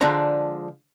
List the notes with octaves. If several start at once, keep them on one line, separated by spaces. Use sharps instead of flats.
D3 F3 G#3 D4 A#5